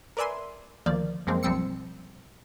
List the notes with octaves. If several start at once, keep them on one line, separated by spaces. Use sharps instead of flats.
A#4 B4 D5 E5 G#5 C6
D2 D#3 F3 A#3 D5
F#2 F3 G#3 A#3 C4
B1 F3 G3 C4 E6 C#7